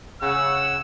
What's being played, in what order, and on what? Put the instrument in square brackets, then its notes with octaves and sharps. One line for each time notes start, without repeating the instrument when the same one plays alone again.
[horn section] C#3 F#5 [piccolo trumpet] E6